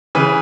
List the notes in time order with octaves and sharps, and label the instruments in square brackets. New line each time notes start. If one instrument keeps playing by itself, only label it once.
[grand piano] C#3 E3 B4